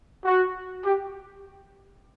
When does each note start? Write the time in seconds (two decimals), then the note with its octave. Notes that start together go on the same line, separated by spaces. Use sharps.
0.24 F#4
0.83 G4